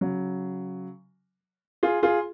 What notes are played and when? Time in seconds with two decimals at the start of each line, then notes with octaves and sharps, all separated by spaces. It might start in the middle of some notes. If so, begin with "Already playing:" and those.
0.01 C#3 F#3
1.83 F4 G#4
2.03 F4 G#4